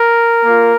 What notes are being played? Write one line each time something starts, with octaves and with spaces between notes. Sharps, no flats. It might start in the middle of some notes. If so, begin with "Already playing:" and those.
Already playing: A#4
A#3 F4